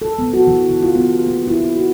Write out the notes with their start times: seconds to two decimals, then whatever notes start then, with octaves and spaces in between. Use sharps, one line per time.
0.02 A4
0.19 B3
0.33 F#4
0.47 E3
0.70 C#3
0.82 F4
0.95 B3
1.14 G4
1.27 A#3
1.48 E4
1.60 A#3
1.76 F#4